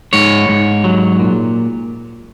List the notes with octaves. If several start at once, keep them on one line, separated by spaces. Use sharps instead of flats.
G#2 C#5
G#2
F#3
A#2